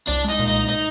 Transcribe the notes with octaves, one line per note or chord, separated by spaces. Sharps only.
C2 D4
G#3
D#4
A#2
C2 D#4
D#4